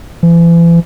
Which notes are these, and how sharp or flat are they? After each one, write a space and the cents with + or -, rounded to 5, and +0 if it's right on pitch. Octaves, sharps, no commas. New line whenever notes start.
E3 +40